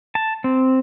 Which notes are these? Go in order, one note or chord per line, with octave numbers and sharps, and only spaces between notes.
A5
C4